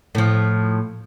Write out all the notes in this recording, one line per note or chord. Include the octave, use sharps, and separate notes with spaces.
A2 F3